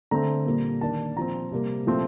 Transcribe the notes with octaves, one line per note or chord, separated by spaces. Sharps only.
D3 A3 C4 A#5
A#2 G3 A#3
D#3 A#3 D4 A5
A#2 F3 C4 A#5
C3 G3 A#3
A#2 F3 A3 C4